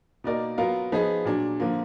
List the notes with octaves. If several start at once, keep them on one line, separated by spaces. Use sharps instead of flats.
B2 A#3 D#4 A#4 D5
F#3 B3 F4 A#4 F5
F3 B3 D#4 G#4
A#2 F#3 D4
D3 F3 A#3 F4